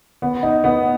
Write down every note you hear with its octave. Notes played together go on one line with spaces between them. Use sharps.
B3
D#4
B3